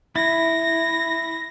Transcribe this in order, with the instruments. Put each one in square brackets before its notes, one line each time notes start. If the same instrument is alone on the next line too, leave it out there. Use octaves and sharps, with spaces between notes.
[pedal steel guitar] E4 [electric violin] A#6